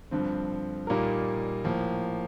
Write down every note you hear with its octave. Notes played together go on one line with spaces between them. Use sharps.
G2 D3 F3 C4
A#2 G3 A#3 D#4 A#4
A2 F3 A#3